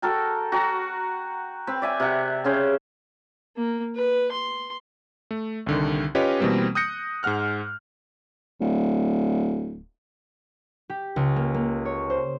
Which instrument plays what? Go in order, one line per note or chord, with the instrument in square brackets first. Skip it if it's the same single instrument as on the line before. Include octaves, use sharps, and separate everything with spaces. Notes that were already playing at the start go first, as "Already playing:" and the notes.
[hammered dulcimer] F#4 A4 A#4 G5
F#4 G5 A#5
C4 B4
D5 E5 G#5
C3 F#5
C#3 C#4 C5
[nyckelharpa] A#3
B4
C6
[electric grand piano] A3
C2 D3 D#3
C#4 F4 G4 B4 C#5 D#5
B2 E3 G3 A#3 C4
D#6 F#6 G6 A#6 C#7
G#2 G#3 F#5 F6 F#6
[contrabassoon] D1
[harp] G4
C#2
A#3
A#3
C#5
C5